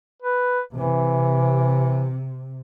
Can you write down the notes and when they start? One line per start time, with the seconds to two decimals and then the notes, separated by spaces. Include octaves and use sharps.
0.22 B4
0.74 C3 E3